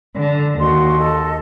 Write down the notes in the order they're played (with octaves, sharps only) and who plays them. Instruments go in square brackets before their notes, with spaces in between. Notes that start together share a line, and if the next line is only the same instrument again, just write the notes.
[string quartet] D3
[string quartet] D#2 [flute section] F#4 D#5 C6
[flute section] A4 D#5